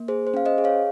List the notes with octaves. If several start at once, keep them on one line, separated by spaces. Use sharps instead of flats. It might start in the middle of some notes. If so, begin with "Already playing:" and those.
Already playing: A#3
G#4 C5
C5
C#4 F5
C5 D#5
G#4
C#5 F5